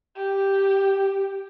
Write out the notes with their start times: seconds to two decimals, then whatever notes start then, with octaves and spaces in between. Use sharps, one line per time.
0.16 G4